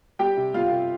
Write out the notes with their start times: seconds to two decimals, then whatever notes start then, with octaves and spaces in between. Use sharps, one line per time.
0.19 G3 G4 G5
0.37 C3
0.54 G3 F4 F5
0.71 C3